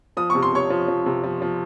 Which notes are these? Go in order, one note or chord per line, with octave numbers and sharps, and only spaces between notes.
F3 D#6
C3 C#6
C6
C3 C#5 C#6
F3
F3
C3
F3
F3